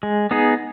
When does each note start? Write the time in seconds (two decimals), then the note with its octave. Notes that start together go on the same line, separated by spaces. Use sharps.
0.03 G#3
0.31 B3 D#4 G#4